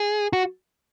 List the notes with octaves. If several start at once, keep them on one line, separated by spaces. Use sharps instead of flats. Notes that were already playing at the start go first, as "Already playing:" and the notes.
Already playing: G#4
F#4